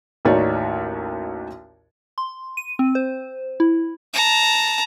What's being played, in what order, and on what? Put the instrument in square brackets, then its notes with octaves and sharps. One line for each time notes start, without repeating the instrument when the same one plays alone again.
[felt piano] A1 D#2 D#4 F#4 C#5 D5
[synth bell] C6
D#7
C4
C5
E4
[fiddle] A5 A#5